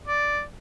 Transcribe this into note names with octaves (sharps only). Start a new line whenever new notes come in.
D5